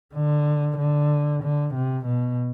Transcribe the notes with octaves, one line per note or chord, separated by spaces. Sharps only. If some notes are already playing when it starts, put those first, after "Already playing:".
D3
D3
D3
C3
B2